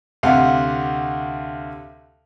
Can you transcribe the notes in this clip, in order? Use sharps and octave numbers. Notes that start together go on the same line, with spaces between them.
D2 C3 F5 F#5